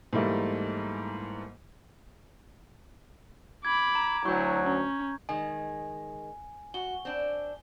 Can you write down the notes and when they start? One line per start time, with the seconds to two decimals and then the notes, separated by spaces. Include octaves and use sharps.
0.13 G#2 E3 G3 A3 A#3
3.65 B5 D6 G#6
3.95 A#5
4.25 D2 F#3 E4 C#6 G6
4.65 C#4
5.29 D#3 G#3 G#5
6.74 F#4 G7
7.05 C4 D4